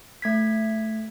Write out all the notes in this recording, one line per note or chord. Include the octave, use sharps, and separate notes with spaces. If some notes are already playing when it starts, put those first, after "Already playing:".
A3 G#6 B6